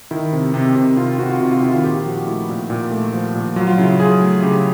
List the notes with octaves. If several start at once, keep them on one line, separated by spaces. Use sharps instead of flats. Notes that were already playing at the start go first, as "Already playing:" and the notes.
D#3 E4
C3
C3
C3
C3 F4
C3 F#4
F4
C3 F4
F4
D#3 E4
F4
A#2 G4
F3 F#4
A3 E4
A#2
A#2
A3
F3
A#2
F#3 F4
F4
C#3 E4
F4
F#3 G#4
A3
C#3 G4